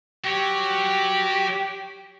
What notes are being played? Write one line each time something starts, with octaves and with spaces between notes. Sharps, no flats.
F#4 G4 C#5